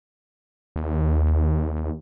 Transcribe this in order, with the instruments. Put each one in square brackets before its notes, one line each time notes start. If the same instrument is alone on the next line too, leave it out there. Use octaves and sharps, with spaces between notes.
[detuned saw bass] D#2